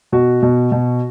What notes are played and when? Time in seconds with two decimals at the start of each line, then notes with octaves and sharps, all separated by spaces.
0.12 B2 F#4
0.43 B2
0.72 B2